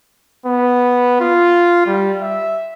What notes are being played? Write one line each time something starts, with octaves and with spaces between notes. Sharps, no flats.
B3
F4
G3
E5